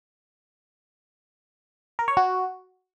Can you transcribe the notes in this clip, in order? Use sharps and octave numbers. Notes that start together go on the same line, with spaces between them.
A#4
C#5
F#4